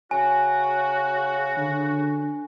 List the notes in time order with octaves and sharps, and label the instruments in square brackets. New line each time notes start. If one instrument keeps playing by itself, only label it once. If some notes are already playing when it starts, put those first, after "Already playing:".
[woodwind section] C#3 F#4 [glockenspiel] G#5
[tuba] D3